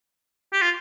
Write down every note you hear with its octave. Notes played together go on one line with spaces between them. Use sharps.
G4
F4